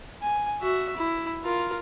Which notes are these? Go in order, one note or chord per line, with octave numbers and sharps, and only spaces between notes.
G#5
F#4 E5
E4
F4 A#4